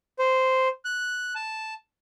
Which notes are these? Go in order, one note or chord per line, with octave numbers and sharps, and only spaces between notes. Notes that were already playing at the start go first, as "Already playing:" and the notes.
C5
F#6
A5